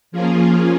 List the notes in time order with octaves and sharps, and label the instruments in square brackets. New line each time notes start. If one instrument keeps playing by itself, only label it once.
[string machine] F3 A#3 C#4 F4 G#4